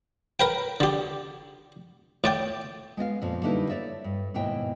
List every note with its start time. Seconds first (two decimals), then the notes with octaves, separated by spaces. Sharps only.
0.40 A#4 B4 G5
0.80 D3 G4
2.24 A2 D5 G5
2.97 G#3 B3 D#5 F5
3.22 F2 A#2 F3
3.43 D3 G3 A#3 D#4 E4 B4
3.69 C#5 D5 E5
4.04 G2
4.34 D#2 G#2 B2 E4 G5